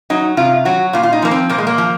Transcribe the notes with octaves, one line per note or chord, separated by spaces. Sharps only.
F#3 D#4
C3 F4
F#3 F#4
A#2 F4
F4
D#4
F3 A#3
C4
A#2 A#3
G#3
A#3
F3